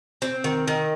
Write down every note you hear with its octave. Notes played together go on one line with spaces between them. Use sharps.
C4
D#3
D#3